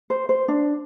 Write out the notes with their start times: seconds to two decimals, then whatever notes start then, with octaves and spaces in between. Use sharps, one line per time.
0.10 C5
0.29 C5
0.48 D4